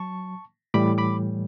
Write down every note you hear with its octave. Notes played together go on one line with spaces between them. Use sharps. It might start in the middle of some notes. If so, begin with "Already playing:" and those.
Already playing: F#3 A5 C#6
A2 E3 G3 B5 D6
B5 D6